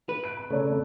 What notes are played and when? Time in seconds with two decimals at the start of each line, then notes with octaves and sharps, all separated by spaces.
0.09 B4
0.24 F#6 D7
0.37 B5
0.50 C#3 A3 C#5 D5 A#5
0.70 F2